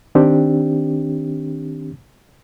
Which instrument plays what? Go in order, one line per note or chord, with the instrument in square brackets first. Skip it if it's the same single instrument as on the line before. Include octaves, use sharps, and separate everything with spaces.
[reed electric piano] D#3 C4 D4 G4